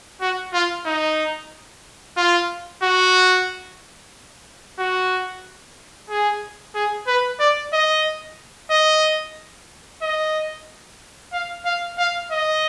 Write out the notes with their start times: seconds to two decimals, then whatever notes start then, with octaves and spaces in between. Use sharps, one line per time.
0.21 F#4
0.53 F4
0.86 D#4
2.17 F4
2.83 F#4
4.79 F#4
6.10 G#4
6.75 G#4
7.07 B4
7.40 D5
7.73 D#5
8.71 D#5
10.02 D#5
11.32 F5
11.65 F5
11.98 F5
12.32 D#5